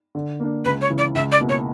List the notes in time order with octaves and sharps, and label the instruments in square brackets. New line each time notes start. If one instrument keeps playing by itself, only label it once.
[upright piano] D3
A#3 D4
[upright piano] C#2 [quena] B4
[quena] C#5
[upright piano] C#3 E3
[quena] D5
[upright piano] C#2 [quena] E5
[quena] D5
[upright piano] B2 A#3 E4
[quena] C#5